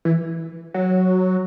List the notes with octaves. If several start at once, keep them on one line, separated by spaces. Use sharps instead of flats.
E3
F#3